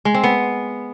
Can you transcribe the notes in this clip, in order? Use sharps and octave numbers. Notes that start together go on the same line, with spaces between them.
G#3
C4
B3